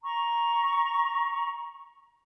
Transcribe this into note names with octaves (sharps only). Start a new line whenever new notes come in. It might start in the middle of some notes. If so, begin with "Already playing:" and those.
A#5 C#6